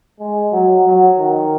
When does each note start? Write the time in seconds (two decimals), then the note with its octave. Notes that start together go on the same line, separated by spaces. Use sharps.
0.20 G#3
0.52 F#3
0.86 F#3
1.19 D#3